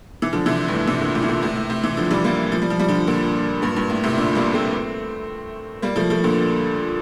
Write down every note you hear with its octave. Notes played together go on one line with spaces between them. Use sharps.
E3
D3 F3
C3 E3
G2
A2
C3 E3
A#2 D3
A2 C3
E3
A#2 D3
A2 C3
A2
A2 C3
C3 E3
D3 F3
E3 G3
G3 A#3
F3
G3
F3
G3
D3 F3
A#2 D3
G2 A#2
G2
A2
A2 C3
A#2 D3
G3 A#3
A3 C4
G3 A#3
F3 A3
F3 A3
A#2 D3